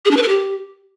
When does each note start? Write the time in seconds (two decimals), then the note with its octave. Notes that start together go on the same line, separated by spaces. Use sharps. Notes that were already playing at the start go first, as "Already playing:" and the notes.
0.05 G#4
0.11 D4
0.17 B4
0.22 A#4
0.28 G4